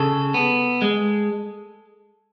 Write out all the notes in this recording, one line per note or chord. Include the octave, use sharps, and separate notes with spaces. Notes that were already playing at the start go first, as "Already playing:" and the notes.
Already playing: C#3 A4
B3
G#3